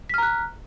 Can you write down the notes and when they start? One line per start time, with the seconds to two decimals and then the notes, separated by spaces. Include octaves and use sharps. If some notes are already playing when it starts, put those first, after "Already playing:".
0.09 B6
0.14 F6
0.18 A#5
0.22 F#6